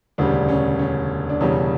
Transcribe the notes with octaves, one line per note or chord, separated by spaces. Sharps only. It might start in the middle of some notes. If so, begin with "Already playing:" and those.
E1 D2 C#3 G3 D4
C#4
C#4
D4
E1 E2 C#3 G3 C#4